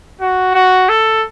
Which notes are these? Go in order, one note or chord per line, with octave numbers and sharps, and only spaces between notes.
F#4
F#4
A4